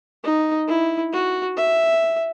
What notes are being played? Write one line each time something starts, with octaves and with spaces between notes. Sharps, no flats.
D#4
E4
F#4
E5